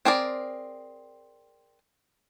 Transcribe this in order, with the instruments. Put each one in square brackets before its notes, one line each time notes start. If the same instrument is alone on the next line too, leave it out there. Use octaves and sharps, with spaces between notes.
[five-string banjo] C4 G#4 A#4 D5